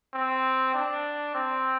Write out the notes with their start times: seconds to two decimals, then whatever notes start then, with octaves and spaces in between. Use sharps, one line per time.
0.14 C4
0.74 D4
1.35 C4